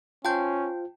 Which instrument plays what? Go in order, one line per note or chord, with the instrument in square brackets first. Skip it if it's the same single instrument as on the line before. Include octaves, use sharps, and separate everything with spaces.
[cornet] C#4 [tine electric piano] F4 C5 [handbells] G5 A5 G6